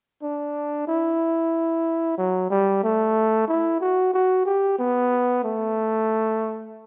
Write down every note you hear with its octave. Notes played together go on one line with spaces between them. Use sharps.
D4
E4
F#3
G3
A3
E4
F#4
F#4
G4
B3
A3